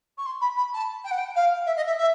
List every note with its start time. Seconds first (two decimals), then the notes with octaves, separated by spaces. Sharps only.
0.18 C#6
0.26 C6
0.41 B5
0.57 B5
0.73 A5
1.04 G5
1.11 F#5
1.18 G5
1.35 F5
1.66 E5
1.76 D#5
1.86 E5
1.97 E5